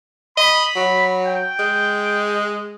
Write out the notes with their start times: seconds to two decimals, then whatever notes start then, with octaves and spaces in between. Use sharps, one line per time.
0.37 D#5 B5
0.75 F#3
1.24 G5
1.59 G#3